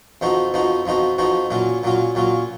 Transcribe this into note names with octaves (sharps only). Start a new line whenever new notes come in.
F2 F3 B3 D#4 F#4
F2 F3 B3 D#4 F#4
F2 F3 B3 D#4 F#4
F2 F3 B3 D#4 F#4
A#2 F#3 C#4 F4
A#2 F#3 C#4 F4
A#2 F#3 C#4 F4